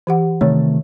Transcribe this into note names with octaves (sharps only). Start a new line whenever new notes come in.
E3 G4 F#5
C3 D#3 A3 C#5